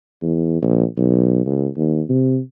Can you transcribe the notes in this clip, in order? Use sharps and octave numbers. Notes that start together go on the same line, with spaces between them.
E2
A#1
B1
C#2
D#2
C3